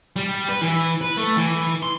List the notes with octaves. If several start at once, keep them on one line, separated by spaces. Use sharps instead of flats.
G3
B4
E3
B4
A3
E3
C6